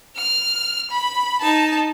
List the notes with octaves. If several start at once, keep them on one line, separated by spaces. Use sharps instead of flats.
F6
B5
D#4 A5